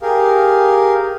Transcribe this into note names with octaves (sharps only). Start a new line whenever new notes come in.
G4 G#4 A#4 F5